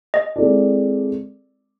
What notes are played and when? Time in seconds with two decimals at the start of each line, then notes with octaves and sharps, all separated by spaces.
0.14 D#5
0.36 G#3 C4 E4 A4 D5